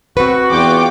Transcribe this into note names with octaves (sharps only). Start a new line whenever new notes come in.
C4 F#4 B4
E2 F4 G5 D6